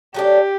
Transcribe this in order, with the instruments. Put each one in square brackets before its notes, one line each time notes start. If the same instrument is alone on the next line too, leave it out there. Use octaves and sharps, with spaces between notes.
[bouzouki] F#3 A3 D4 [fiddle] G4